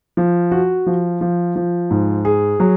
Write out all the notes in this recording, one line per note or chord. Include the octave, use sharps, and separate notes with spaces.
F3
F#4
F3
F3
F3
G#2
G#4
F#3